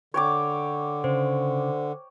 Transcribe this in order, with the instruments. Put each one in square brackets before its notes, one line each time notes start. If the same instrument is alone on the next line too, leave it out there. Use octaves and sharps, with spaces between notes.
[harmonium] D3 [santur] C#5 G5 D6
[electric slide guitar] C#3 [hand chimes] C5